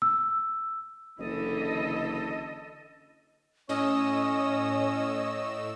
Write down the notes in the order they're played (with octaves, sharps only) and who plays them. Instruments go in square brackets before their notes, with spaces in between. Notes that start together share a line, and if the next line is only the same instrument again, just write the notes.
[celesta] E6
[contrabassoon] F#1 [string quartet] D3 E3 [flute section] A4 D#5
[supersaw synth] A2 E6 [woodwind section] C#4 [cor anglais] C#5 [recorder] D#5